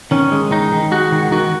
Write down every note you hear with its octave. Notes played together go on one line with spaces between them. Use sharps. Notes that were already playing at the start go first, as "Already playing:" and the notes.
D#3 C#4
G#3
D#3 D#4
D#3
G#3 F#4
D#3
D#3 F#4